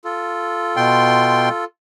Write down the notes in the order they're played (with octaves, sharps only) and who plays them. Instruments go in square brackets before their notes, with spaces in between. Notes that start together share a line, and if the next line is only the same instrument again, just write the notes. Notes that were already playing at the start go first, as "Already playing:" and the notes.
[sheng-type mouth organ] F4 A4
[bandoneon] B2 G5 C6